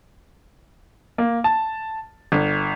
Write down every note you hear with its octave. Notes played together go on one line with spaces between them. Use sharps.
A#3
A5
G1